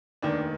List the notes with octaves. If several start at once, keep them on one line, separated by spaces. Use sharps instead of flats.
F1 D#2 D#3 D4